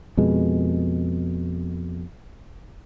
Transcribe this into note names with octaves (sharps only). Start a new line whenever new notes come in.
F2 B2 G#3